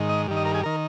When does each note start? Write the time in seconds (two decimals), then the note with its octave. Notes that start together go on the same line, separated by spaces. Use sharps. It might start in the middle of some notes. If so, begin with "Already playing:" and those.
Already playing: G#2 D#3
0.09 D#5
0.28 G2 D#3
0.37 D#5
0.45 A#4
0.55 G#4
0.63 D#3 A#4